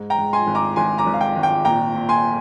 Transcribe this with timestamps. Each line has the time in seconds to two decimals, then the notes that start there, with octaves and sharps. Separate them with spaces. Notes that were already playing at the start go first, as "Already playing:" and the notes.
Already playing: G#2
0.10 G5 A#5
0.18 G#2
0.33 G#5 C6
0.47 G#1
0.55 A#5 D6
0.76 G#1 G#5 C6
0.98 A#5 D6
1.07 G#1
1.14 F5
1.21 G5
1.36 G#1
1.43 G5
1.65 A#2 G5 A#5
1.95 A#2
2.09 G#5 C6